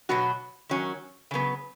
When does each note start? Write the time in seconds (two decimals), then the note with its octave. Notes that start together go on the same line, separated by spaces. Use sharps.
0.09 B2 F#3 B3 F#4
0.69 D#3 F#3 C#4
1.31 C#3 F#3 B3